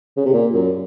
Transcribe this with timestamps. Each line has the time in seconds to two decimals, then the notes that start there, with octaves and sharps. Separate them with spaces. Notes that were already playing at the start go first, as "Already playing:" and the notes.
0.17 C#3
0.25 C3
0.33 A#2
0.54 F#2